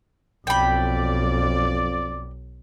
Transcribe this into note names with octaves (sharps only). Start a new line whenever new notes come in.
B1 F2 D5 G5 B5